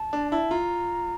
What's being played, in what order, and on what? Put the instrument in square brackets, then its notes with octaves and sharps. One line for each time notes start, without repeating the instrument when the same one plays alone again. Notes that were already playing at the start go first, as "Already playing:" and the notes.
Already playing: [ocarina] A5
[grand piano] D4
[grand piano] E4 [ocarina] A5
[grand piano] F4 [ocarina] A#5